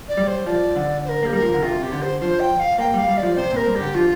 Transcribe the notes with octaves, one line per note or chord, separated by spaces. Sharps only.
D5
G3
C5
F3 D5
D3
C5
A#4
A#3 G4
G3 A#4
F3
D3
C3 F4
C3 G4
D3
C5
F3 C5
G5
F5
A#3 G5
G3 F5
G3
D5
F3
C3 C5
A#2 A#4
G2
G4
D3
F3 F4